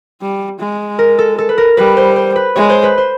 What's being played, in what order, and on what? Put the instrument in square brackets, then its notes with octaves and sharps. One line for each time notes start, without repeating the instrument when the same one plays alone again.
[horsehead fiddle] G3
G#3
[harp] A#4
A4
A4
B4
A#4
[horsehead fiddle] G3 [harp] B4
[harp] C5
C5
B4
[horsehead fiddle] G#3 [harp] C#5
[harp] C5
B4
C5